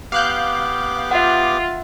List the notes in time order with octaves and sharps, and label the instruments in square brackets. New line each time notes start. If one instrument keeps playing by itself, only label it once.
[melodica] B3 G4 D6 [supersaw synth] F5 F#6 G6
[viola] F4 [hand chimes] E5 F#5